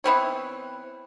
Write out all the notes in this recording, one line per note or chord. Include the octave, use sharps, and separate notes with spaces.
E3 B3 C4 C#5